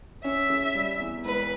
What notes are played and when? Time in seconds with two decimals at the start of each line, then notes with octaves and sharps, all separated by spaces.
0.24 C#4 E5
0.50 C#3
0.75 G3
1.00 E2
1.25 E1 B4